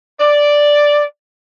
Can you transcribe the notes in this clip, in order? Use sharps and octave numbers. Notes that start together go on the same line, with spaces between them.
D5